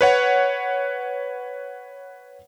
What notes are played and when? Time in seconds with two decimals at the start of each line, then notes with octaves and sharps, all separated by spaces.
0.01 B4 C#5 F#5